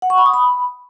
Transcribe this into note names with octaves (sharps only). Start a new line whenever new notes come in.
F#5
C#6
B5
D#6
B5